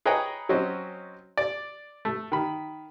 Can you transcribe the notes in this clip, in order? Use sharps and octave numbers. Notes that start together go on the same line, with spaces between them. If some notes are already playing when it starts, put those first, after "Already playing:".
G#4 B4 C#5 D#5 G5 A#5
F#3 C4 C#4 D#5
D5
A3
D#3 B5